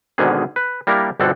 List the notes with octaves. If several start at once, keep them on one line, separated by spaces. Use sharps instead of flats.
G#1 G#2 B2 D3 D#3 G#4
B4
G3 A#3 D4 E4 A#4
G1 B2 D3 C4 A4 F#5